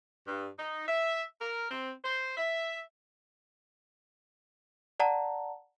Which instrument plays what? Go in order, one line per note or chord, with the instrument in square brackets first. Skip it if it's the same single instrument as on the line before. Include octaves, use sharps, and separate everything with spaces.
[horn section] G2
D#4
E5
A#4
C4
C5
E5
[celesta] D5 F#5 A5 A#5